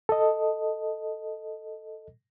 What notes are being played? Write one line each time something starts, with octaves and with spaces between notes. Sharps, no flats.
A4 D#5